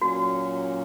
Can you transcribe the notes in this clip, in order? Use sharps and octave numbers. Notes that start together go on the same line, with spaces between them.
A#2 F#3 A#3 C#4 F#4